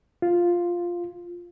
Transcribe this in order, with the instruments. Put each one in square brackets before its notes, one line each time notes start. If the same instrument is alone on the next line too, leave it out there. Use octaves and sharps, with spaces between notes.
[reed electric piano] F4